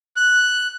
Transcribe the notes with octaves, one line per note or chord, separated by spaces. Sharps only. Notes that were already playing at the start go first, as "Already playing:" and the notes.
F#6